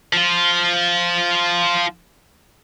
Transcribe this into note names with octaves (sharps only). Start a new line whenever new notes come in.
F3 F4